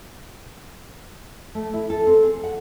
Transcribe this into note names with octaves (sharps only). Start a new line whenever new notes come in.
A3
E4
A4
C4
G#4
F#5